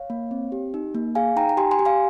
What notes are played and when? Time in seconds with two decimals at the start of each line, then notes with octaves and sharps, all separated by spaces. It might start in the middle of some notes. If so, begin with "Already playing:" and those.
Already playing: C#5 F5
0.10 A#3
0.31 C4
0.52 G4
0.74 D#4
0.95 A#3
1.15 G#4 F5 G#5
1.36 D#4 G5 A#5
1.49 A#5
1.57 G4 G#5 C6
1.71 G#5 C6
1.79 G4
1.85 F5 G#5